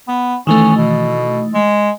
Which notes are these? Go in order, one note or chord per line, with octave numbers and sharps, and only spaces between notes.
B3
D#3 E3 A3 C#4
B2
G#3